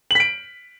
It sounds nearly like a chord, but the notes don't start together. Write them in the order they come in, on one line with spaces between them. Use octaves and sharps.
F#7 B6 D7